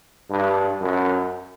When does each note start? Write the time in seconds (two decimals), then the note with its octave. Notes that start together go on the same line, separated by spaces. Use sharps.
0.30 G2
0.81 F#2